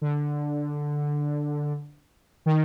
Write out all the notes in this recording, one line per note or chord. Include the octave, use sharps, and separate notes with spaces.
D3
D#3